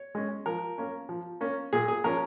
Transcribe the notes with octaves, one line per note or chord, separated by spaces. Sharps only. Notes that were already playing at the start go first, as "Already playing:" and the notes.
Already playing: C#5
G#3 C#4
F3 A#4
A#3 C#4
F3
A#3 C#4
A#2 G#4
G#4
F3 A#3 C#4 A#4